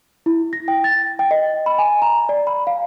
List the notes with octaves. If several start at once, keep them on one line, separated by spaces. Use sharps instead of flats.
E4
A#6
G5
A6
G5
D#5
B5
G#5
A#5
D5
B5
F5